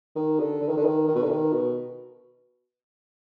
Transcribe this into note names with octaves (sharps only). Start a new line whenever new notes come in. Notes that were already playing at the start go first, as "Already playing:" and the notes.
D#3
D3
D3
D#3
D3
D#3
D#3
B2
D3
D#3
B2